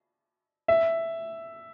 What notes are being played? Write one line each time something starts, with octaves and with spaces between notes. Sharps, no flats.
E5